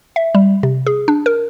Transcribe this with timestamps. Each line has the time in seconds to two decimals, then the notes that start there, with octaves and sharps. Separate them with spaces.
0.16 E5
0.35 G3
0.63 C3
0.87 G#4
1.08 D4
1.26 A#4